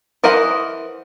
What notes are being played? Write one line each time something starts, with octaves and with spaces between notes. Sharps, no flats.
E3 A#4 C5 D#5 F#5